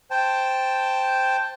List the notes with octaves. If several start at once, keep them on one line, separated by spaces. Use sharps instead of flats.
C5 G5 A5